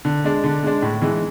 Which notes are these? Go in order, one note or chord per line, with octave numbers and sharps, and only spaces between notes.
D3
G#3 D4
D3
G#3 D4
A2
E3 G#3